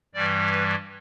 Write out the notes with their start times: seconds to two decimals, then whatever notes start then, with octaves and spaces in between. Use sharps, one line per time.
0.14 G2 E3 G3 D5
0.52 B4